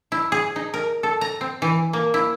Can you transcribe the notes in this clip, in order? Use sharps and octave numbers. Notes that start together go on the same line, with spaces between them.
E4
G#4
D#4
A#4
A4
A#5
C4
E3
A#3
E4